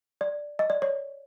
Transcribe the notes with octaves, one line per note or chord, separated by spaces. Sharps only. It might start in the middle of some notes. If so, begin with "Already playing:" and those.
D5
D#5
D5
C#5